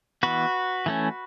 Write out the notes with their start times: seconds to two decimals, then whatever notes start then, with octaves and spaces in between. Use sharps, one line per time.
0.23 E3 B3 F#4 B4
0.86 E3 A3 C#4